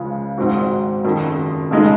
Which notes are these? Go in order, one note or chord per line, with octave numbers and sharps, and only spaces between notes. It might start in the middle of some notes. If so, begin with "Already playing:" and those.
Already playing: C#2 C#3 F3 G#3
G#1 G#2 F#3 C4 F#4
F#1 F2 D#3 F#3
F1 F2 C#3 G#3 D#4